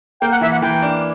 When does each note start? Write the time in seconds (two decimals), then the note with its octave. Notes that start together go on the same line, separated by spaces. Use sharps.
0.21 A#3 G5
0.31 F#5
0.41 E3 E5
0.52 F#5
0.62 E3 G5
0.82 D4